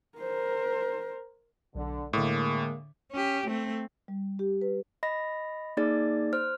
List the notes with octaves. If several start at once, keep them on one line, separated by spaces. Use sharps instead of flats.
A#4 C5
B1 D3
A2 D3 G#3 A#3 D6
C#4 G4
A3 C4
G3
G4
B4
D#5 B5 A#6
A#3 D#4 G#4 D5 A6
C5 F6